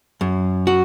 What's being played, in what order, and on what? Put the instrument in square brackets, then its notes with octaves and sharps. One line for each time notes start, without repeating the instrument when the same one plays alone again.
[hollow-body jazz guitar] F#2
F#4